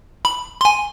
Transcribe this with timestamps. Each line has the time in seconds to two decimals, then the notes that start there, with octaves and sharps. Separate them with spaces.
0.25 B5
0.61 G#5 C6